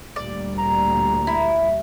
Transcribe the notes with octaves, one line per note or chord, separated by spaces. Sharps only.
D2 A#2 G3 D5
A#5
E4